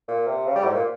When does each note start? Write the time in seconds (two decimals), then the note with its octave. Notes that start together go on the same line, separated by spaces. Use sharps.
0.08 A#2
0.27 C3
0.46 C#3
0.55 G3
0.65 G#2
0.74 A#2